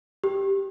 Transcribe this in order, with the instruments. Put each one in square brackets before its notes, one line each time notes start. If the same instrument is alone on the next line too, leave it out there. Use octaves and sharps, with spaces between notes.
[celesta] G4